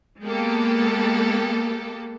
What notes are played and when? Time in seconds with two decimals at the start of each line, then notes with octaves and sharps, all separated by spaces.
0.23 G#3 A#3 B3 G4 A4